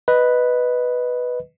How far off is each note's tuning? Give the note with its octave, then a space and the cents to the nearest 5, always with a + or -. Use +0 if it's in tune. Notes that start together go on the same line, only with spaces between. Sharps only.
B4 +0 D#5 +0